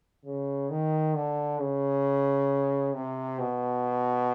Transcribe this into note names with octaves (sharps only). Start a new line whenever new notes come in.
C#3
D#3
D3
C#3
C3
B2